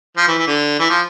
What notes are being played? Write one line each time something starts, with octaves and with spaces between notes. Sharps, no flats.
F3
E3
E3
D3
E3
F3